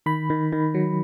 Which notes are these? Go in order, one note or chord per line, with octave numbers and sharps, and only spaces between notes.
D#3 B5
D#3
D#3
F#3